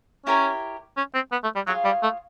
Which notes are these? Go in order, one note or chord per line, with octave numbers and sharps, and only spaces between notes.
C#4 E4 G4 A#4 C#5
C#4
C4
B3
A3
G3
F#3 F4 G#4 C#5 F5
G3
A3